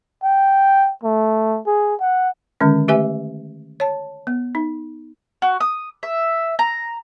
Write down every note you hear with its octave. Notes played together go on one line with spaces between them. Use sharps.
G5
A3
G#4
F#5
D3 D#3 G#3 C#4
A3 G4 B4 E5 G#5
C#5 A5
B3
D#4
F#4
D#6
E5
A#5